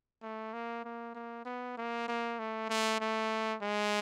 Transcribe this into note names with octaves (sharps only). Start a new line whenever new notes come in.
A3
A#3
A#3
A#3
B3
A#3
A#3
A3
A3
A3
G#3